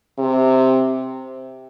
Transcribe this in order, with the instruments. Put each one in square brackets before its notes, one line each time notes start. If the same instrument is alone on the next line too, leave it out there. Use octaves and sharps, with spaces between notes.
[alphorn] C3